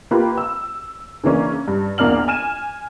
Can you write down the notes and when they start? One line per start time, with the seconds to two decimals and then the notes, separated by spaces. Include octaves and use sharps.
0.11 A#3 F4 G4 B4
0.38 E6
1.24 C#3 E3 A#3 C#4 D4
1.68 G2
1.98 A#1 E2 A#3 D4 F6 F#7
2.28 G#5 F6 D#7 E7